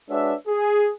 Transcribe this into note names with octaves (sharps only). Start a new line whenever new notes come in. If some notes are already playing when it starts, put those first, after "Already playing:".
G#3 D4 F#4 B4 C#5 E5
G#4